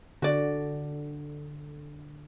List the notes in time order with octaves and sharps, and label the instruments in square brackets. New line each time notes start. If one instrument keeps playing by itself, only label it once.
[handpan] D3 [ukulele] F#4 D5